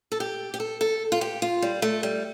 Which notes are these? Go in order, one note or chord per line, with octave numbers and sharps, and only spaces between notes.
A4
G4
G4
A4
A4
F4
G4
F4
G3
A3
G3